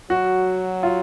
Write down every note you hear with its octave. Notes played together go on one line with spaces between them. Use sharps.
F#3 F#4
F4